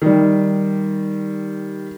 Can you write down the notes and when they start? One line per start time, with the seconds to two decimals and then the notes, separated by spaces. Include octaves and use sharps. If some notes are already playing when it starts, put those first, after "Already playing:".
0.02 D#3 G3